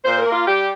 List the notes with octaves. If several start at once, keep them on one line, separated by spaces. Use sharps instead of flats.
A#2 C5
A#4
A#3
F4
G3 G4